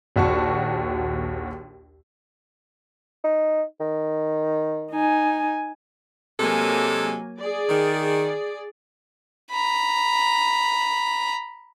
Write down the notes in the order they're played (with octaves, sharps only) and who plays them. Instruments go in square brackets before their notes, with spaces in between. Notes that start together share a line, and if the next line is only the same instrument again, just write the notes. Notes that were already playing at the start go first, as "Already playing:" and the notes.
[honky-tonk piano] A#1 D#2 F#4 A5 C#6
[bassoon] D#4
D#3
[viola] D#4 G#5
[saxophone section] C3 G#3 A4 [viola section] F#3 A#3 G#5
[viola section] G#4 D5
[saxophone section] D#3
[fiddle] A#5 B5